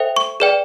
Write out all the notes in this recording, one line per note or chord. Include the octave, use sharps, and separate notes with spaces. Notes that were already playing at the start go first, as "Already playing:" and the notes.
Already playing: A4 C5 E5 G5
C#6
G#4 B4 D5 G5